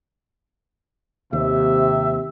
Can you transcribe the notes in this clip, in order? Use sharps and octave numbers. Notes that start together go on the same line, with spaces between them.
D#2 C3 E5